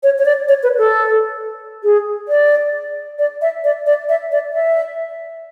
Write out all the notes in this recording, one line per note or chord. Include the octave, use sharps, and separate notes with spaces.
C#5
C#5
D5
C#5
B4
A4
G#4
D5
D5
E5
D5
D5
E5
D5
E5